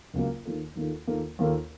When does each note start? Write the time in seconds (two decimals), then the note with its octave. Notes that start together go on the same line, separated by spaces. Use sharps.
0.14 C#2 C#3 F#3 A#3
0.45 D#2 D#3 A#3 F4 A4
0.76 D#2 D#3 A#3 F4 A4
1.07 D#2 D#3 A#3 F4 A4
1.39 D#2 D#3 A#3 F4 A4